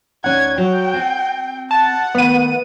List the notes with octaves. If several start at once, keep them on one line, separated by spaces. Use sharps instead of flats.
D2 C#4 D#4 F#5 G#6
F#3 G5
C4 G#5
F#5 A5
D#3 A3 B3 D#7